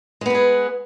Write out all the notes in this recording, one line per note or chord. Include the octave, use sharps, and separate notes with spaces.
G#3 B3 G#4 B4